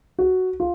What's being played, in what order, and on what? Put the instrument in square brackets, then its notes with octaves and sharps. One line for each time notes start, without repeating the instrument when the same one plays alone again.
[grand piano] F#4
F4